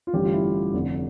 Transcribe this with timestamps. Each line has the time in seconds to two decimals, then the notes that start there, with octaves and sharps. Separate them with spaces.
0.07 F4
0.13 A1 G2 D3 G4
0.24 F4
0.33 E4
0.43 E4
0.74 F1 F2 D3